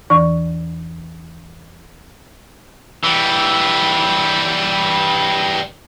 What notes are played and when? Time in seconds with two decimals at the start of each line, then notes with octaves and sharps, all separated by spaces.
0.10 E2 E3 D5 C#6
3.04 E3 G3